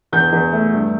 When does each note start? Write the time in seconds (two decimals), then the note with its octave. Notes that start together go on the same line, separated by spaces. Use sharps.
0.12 E2 G6
0.32 E2
0.52 A3
0.73 G2